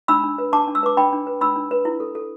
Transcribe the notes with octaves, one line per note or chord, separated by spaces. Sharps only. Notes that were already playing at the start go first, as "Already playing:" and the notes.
D4 B5 E6
D4
B4
D4 A5 D6
D4
E6
B4 D6
D4 G5 B5
D4
B4
D4 B5 E6
D4
B4
E4
A4
A4